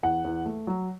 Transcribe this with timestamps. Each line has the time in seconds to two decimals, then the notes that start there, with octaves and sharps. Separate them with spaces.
0.03 E2 F#5
0.25 E2
0.46 A3
0.67 F#3